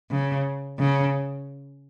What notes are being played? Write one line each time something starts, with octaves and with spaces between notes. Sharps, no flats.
C#3
C#3